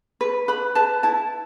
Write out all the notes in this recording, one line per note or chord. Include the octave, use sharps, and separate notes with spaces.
B4
B4 B5
B4 A5
E4 A5